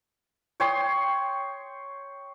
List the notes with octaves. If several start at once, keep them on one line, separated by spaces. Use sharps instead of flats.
C#5 G5 C6 D#6